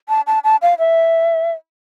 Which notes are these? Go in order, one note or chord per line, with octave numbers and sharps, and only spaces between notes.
A5
A5
A5
F5
E5